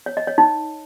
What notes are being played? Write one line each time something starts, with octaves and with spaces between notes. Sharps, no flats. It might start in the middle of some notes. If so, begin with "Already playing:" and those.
C#5
D#5
C#5
D#4